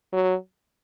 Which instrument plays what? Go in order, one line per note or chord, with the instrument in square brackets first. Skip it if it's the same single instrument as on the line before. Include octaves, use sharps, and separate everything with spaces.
[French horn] F#3